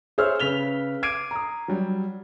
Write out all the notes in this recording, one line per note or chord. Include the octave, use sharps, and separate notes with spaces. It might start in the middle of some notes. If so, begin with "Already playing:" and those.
G#4 C5 C#5 E5 E6 F6
C#3 B4 B6 F7 G7
D6 G#6 C7 D7 D#7
A#5 D#6
F#3 G3